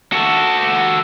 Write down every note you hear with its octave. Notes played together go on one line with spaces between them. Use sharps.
F#4 A4